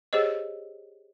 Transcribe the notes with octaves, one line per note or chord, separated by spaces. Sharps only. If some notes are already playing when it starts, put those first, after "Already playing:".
G4 G#4 C5 C#5 D#5